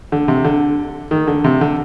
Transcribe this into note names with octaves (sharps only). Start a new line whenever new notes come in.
D3
C3
D3
D#3
D3
C3
D3